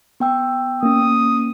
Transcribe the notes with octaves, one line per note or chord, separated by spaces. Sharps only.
B3 G5 E6
A#3 C#4 D#6